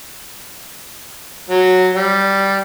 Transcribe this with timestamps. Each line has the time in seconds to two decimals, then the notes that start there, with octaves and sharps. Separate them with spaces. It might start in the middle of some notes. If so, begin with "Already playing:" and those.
1.50 F#3
1.94 G3